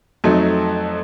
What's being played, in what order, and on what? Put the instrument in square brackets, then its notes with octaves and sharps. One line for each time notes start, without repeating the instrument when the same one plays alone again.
[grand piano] F2 F#3 A3 D#4